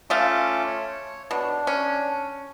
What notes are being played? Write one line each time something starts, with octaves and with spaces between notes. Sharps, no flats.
A3 C#4 F4 D#5 F5 D6
C#5
B2 D4
C#4